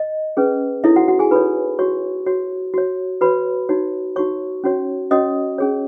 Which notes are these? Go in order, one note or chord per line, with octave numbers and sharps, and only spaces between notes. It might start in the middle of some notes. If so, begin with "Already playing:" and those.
Already playing: D#5
C#4 G#4 B4
D#4 E4 A4 C#5 E5
F#4 F#5
F#4 F#5
G#4 G#5
D#4 A4 B4 C#5 B5
F#4 C#5 C#6
F#4 C#5
F#4 C#5
F#4 B4 C#5 B5
D#4 F#4 C#5
D#4 F#4 C#5 C#6
C#4 F#4 C#5
C#4 F#4 C#5 D#5 D#6
C#4 G#4 C#5